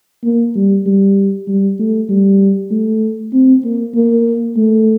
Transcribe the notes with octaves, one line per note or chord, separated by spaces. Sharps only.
A#3
G3
G3
G3
A3
G3
A3
C4
A#3
A#3
A3